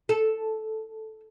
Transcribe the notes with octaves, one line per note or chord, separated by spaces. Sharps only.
A4